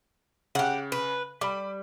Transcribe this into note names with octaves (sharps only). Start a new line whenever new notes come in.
C#3 G4 F#5
B4
G3 B5 D6